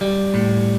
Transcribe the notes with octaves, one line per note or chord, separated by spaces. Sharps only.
G3
A2